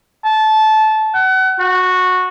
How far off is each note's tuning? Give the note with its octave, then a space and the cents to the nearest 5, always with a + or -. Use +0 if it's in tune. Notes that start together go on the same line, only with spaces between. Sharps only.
A5 -20
F#5 +30
F#4 -10